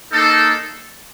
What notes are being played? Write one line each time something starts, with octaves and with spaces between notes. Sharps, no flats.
A#3 D#4 A4